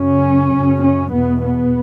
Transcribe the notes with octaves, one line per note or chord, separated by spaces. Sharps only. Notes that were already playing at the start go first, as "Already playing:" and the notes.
Already playing: F#2 C#3 C#4
F#2 C#3
C#4
E2 B2 B3
B3